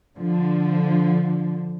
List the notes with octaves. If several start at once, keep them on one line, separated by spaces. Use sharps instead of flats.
D3 F3